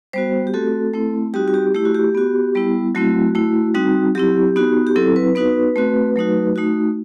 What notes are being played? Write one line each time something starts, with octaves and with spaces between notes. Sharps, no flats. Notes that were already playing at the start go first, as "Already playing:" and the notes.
G3 B3 F#4 C5
G4
A3 C4 F#4 A4
A3 C4 E4
G3 C4 D#4 F#4 G4
F#4
G4
A3 E4 G4
F#4
G4
B3 F#4
G3 B3 E4
F#3 A3 C4 E4 F#4
A3 E4
G3 C4 D#4 F#4
F#3 C4 E4 G4
B3 D#4 F#4
G4
F#3 C4 E4 A4
B4
B3 D#4 F#4 B4
A3 C4 F#4
F#3 A3 D#4 F#4
A3 D#4 F#4